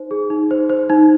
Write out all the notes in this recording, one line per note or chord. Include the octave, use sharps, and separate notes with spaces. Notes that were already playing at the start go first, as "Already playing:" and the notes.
Already playing: D#4 C5
G#4
D#4
C5
C5
D#4